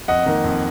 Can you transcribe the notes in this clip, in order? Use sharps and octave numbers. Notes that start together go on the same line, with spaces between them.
F2 D#5 F#5
D#3 A#3
F2